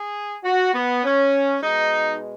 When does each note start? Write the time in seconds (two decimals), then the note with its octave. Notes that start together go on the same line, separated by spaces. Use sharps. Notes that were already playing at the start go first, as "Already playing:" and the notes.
Already playing: G#4
0.44 F#4
0.74 B3
1.04 C#4
1.63 B2 G#3 D#4